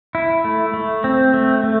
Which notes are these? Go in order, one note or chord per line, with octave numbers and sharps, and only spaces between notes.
E4
A3
A3
C4
A3
A3